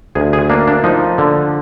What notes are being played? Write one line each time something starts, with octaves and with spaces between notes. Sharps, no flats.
D2 G#4
G#4
A#3 D4
D4
F3 D#4
D3